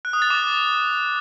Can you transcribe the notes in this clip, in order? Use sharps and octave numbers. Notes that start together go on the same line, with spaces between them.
F#6
D#6
A6
D6